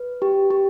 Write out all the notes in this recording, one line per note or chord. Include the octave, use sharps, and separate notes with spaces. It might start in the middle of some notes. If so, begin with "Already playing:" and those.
Already playing: B4
G4
G4